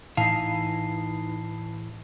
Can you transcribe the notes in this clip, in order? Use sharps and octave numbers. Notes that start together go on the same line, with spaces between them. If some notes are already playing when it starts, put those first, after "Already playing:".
A2 E3 D#4 F5 A5 C7